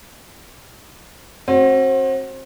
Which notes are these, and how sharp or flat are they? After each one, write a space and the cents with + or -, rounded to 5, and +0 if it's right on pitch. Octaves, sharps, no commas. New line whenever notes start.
C4 +35 F#4 +0